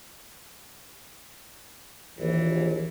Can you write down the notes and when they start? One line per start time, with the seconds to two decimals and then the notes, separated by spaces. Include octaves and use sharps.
2.19 A#1 D#2 E3